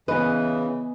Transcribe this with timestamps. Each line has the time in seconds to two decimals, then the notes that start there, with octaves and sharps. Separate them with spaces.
0.08 C#3 E3 B3 B4 D#5 G#5